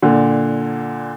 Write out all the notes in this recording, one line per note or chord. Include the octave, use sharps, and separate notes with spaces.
A#2 D3